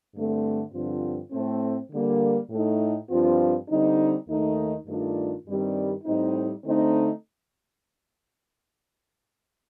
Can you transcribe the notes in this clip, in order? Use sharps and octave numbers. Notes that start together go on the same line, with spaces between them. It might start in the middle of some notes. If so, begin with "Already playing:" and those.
G2 D3 A3 C4
G2 D3 F3 C4 F4
A2 A3 C4
D3 G3 A#3
A2 A3 D#4
G2 F3 C4 F4
D3 G3 C4 D#4
D#2 D#3 A3 D#4
G2 D#3 A3 D4 F4
G2 D#3 G3 C4
A2 G3 C4 D#4
D3 A3 C4 D#4